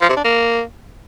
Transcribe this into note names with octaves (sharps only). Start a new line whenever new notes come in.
F3
C3
D4
A#3